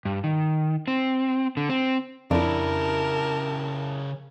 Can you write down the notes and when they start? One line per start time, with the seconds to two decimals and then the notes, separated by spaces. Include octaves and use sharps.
0.05 G2
0.24 D#3
0.88 C4
1.57 D3
1.69 C4
2.31 F2 C#3 D4 E4 G4 A#4 A5